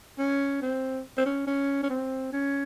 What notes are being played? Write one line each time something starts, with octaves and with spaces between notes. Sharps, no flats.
C#4
C4
C4
C#4
C#4
C#4
C4
C#4